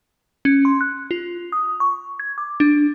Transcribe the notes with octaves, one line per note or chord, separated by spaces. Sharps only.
C#4
C6
F#6
F4
D#6
C#6
G#6
D6
D4